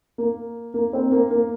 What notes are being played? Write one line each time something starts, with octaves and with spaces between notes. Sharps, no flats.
A#3
A#3
C4
A#3
A#3